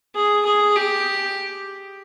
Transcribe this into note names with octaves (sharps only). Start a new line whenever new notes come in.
G#4
G#4
G4